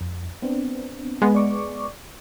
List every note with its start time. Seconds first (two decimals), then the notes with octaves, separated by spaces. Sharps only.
0.01 F2
0.42 B3 C4 D4
1.22 G#3 B3
1.35 D5 C#6 D6